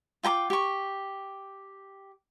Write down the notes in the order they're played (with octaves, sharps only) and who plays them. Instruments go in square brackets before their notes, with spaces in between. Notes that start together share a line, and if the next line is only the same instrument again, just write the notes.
[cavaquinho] F4 G5 A#5 D6
G4 C#6